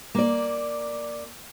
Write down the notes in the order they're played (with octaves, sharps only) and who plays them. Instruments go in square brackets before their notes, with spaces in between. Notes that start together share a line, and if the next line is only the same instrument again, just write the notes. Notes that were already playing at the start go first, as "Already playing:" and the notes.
[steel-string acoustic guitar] A#3 D5